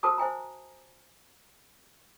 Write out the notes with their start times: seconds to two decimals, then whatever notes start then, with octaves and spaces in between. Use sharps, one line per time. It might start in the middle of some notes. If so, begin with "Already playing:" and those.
0.03 F#4 A#4 C5 A5 D6 D#6
0.18 C5 E5 G#5 A#5